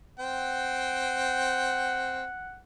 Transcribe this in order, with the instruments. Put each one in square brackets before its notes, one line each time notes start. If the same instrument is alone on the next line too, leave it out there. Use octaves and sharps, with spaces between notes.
[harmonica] C4 G5 [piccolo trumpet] F#5